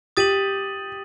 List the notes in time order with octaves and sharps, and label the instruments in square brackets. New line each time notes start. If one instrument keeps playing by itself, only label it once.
[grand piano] G4 [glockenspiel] D#6 A6 D#7 F#7